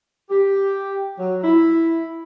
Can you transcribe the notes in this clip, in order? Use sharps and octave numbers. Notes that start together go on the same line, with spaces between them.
G4
F#3
E4